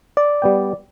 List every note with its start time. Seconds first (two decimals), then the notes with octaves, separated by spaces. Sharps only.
0.17 D5
0.42 G3 B3 G5